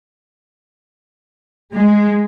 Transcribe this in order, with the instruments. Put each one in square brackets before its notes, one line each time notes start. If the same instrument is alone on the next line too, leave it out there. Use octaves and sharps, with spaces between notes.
[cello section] G#3